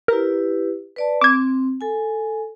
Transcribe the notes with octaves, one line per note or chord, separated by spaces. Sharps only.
E4 G4 A#4 B4
B4 D5 A5
C4 D6 G#6
A4 G#5